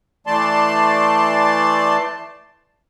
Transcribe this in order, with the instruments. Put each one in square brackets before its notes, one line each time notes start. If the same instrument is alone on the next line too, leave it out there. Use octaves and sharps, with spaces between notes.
[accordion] E3 A3 D5 A5 C6